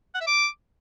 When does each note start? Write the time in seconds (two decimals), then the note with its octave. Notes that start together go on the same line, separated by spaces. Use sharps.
0.14 F#5
0.20 E5
0.26 D6